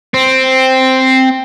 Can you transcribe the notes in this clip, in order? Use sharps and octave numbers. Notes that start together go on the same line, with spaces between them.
C4